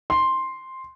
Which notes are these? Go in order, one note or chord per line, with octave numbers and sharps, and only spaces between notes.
C6